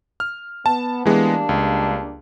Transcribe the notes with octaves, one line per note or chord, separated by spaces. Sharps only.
F6
B3 A5
E3 G3 G#3 A#3 B3 D4
C#2